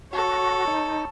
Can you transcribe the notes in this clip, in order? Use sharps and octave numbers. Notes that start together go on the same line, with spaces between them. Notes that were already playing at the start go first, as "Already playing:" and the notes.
F#4 A4 C#5
D#4